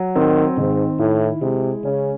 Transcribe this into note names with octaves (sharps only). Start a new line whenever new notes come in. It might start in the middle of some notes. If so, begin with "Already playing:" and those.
Already playing: F#3
D#3 C4
G#2 D#3
A2 E4
C3 G#3
C#3 C#4